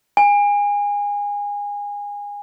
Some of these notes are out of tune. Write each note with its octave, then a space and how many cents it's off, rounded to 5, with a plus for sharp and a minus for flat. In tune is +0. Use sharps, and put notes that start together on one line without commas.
G#5 -25